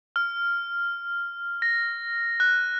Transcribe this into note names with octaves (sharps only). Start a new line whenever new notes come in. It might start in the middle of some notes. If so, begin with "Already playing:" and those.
F6
A#6
F#6